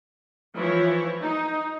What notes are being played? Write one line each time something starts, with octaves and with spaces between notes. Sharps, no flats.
E3 F3 E4 C#5
D#4